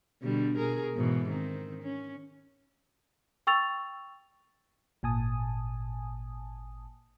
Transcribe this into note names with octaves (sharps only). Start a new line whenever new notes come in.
B2 D3 G3
B2 G#4 A#4
G#2 B2 E3
D#3 C4
C#4
G5 C#6 E6 A6 F7
G#1 A#2 G#5 A5 D#6